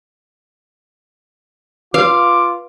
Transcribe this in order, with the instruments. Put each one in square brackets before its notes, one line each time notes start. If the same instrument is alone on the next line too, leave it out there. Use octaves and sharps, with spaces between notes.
[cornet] F4 [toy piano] B4 [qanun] F5 [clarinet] D6